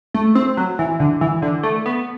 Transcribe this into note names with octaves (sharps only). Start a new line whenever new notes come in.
A3
C4
F#3
E3
D3
E3
D3
A3
B3